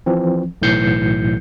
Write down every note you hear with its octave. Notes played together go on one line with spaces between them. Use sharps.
E3 F3 C4
B1 A2 E3 G6 C7 C#7